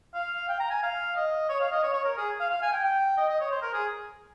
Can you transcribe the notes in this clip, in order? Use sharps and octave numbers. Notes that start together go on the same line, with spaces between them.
F5
G5
A#5
G#5
F5
D#5
C#5
F5
D#5
C#5
C#5
A#4
G#4
F5
F5
G#5
G5
G5
D#5
D#5
C#5
C5
A#4
G#4